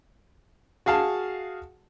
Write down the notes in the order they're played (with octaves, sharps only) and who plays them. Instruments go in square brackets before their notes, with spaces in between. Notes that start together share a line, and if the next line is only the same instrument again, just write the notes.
[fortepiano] F#4 G#4 F5 A5